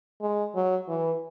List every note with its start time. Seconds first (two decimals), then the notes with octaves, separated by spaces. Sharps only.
0.21 G#3
0.55 F#3
0.88 E3